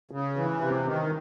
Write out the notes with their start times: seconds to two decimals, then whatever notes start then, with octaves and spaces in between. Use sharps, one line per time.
0.11 C#3
0.36 E3
0.61 C3
0.85 D#3